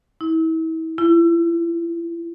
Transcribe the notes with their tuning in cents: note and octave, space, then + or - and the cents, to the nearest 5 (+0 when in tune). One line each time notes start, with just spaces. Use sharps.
E4 -35
E4 +35